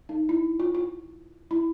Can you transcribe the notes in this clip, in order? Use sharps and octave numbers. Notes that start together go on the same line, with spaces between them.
D#4
E4
F4
F4
E4